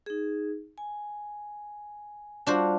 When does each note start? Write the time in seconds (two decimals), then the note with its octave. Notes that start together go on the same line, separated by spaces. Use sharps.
0.06 D#4 G#4
0.78 G#5
2.47 G3 D4 F4 F#4 C5 F5